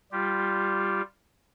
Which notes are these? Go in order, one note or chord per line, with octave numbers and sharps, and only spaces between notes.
G3 F4 G4